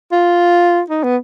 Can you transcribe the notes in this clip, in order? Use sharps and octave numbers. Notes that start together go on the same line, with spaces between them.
F4
D#4
B3